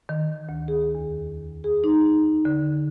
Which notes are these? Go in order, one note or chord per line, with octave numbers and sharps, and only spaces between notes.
D#3
D2
G#4
E2
G#4
D#4
D3